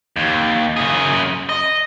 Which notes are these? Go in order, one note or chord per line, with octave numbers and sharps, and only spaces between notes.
D#2
F#2 G#4
D#5